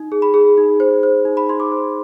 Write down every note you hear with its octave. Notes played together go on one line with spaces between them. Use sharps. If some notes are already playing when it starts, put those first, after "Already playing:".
Already playing: D#4
G#4
B5
G#4
D#4
C5
C5
D#4
B5
D#4 C6
D6
C5